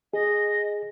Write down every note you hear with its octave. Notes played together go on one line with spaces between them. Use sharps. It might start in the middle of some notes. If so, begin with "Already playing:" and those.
G#4 D#5